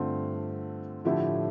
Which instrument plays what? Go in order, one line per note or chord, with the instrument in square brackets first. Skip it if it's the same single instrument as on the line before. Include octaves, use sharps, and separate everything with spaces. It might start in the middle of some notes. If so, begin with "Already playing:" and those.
Already playing: [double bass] G2 [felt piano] D3 A3 C4 F4
[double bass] A2 [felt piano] D3 F3 A3 E4 G4